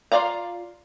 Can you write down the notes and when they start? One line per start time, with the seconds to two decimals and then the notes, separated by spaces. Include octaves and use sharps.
0.12 F4 B4 D5 F5 A#5